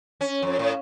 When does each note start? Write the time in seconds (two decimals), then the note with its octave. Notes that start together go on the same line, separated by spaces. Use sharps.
0.21 C#4
0.42 F2
0.59 A2